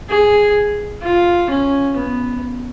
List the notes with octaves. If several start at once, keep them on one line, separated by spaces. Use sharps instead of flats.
G#4
F4
C#4
B3